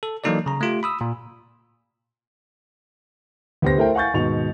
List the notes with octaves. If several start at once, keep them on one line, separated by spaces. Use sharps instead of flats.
A4
E3 F#3 A#3 D#4 A4 D5
C#3 A#5
A3 F4 G4
B5 D#6 E6
A#2
D2 B3 G4 C5 A#6
A3 E4 A#4 C5 G5
F5 F#5 G#5 C#6 G6 A6
D#2 G#2 B2 C#6 F7